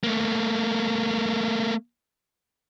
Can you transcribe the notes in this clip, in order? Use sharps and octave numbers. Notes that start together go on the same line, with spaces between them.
A3 A#3